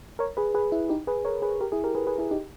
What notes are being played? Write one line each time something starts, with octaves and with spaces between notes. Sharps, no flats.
A#4 C#5
G#4 B4
G#4 B4
E4
D#4 G4
G#4 B4
A#4 C#5
G#4 B4
G4 A#4
E4 G#4
G4 A#4
G#4 B4
G#4 B4
E4 G#4
D#4 G4